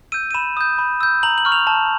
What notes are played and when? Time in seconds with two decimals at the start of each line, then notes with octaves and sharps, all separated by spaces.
0.12 E6 G6 D#7
0.31 D#7
0.34 B5 E7
0.57 D#6 G6
0.78 B5
1.01 E6 G6
1.23 A#5 F#7
1.38 F#7
1.45 C#6 F6
1.52 F7
1.67 A5